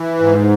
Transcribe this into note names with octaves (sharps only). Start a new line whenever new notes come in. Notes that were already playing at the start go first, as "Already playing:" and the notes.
Already playing: E3
G#2